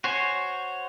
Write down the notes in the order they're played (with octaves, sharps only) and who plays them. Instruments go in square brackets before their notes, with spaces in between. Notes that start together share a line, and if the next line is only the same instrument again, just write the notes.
[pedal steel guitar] F#4 C5 C#5 G#5